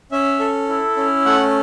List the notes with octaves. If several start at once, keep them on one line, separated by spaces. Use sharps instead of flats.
C#4 E5
A4
E4
C#4
A3 F#5